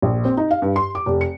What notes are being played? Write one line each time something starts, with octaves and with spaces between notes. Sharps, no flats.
A#1
C4
D#4
F5
G2
C6
D6
F1
C#7